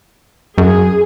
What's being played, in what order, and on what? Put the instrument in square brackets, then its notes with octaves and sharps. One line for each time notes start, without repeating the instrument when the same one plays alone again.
[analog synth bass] F#2 [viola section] G#4